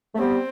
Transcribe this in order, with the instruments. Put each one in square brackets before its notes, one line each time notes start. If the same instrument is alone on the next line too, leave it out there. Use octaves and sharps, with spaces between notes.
[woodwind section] A3
[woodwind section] G3 B3 [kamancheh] C4